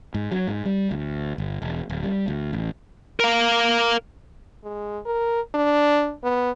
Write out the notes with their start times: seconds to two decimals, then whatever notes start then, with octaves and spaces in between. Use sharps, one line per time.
0.14 G#2
0.32 F#3
0.48 G#2
0.65 G3
0.91 D2
1.38 G1
1.62 E1
1.90 D1
2.03 G3
2.28 D2
2.53 A1
3.20 A#4 F5
4.64 G#3
5.06 A#4
5.55 D4
6.23 B3